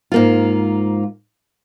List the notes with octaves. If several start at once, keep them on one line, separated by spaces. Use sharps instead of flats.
G#2 A#3 F4